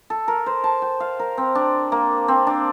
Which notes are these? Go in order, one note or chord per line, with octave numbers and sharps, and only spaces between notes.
A4
A#4
C5
A5
G5
F5
A#4
C4
D4
A#3
C4
D4